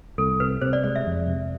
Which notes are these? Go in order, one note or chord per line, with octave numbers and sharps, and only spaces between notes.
C2 A4
C3 B4
C3 C5
D5
G#3 D5
E5
F2
C3